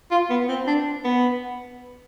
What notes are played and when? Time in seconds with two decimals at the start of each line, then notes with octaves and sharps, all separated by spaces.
0.11 F4
0.30 B3
0.48 C4
0.67 D4
1.04 B3